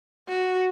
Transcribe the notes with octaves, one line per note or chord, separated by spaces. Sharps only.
F#4